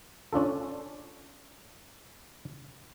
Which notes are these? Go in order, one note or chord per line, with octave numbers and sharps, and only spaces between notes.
C#4 D4 F4 A4